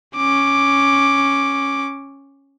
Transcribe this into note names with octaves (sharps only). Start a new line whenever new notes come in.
C#4 D6